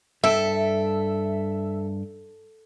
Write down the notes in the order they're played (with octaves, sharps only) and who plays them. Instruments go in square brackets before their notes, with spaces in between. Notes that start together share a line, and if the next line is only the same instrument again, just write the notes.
[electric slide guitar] G2 G5 A5 [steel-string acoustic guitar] A4 [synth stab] E5